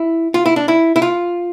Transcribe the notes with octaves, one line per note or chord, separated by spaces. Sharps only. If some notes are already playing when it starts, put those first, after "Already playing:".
Already playing: E4
F4
E4
D4
E4
E4
F4